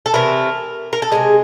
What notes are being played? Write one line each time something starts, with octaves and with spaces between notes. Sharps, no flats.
A4
C3 E3 A3 A#4
A#4
A4
C3 F3 G#3 G#4